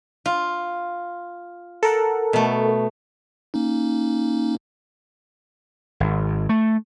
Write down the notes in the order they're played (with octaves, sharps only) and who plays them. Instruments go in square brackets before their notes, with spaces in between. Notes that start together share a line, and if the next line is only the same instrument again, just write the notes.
[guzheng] F4
[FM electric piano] A4 A#4 F#5
[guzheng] B2 A3
[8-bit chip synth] A#3 C#4 D#4
[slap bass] G#1
A3